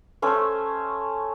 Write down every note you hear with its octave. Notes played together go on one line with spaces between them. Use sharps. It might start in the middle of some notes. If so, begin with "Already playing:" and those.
A3 C#4 C5